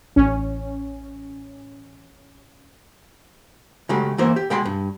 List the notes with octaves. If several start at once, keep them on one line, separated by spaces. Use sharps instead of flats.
A1 C#4
C#3 F#3 G#3 A3 G4
E3 A#3 B3 E4 C5 E5
G4
B2 G#3 G5 B5 C6
G2